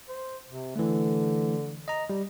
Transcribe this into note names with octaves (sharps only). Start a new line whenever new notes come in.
C5
C3
D3 E3 A3
D#5 A#5
G3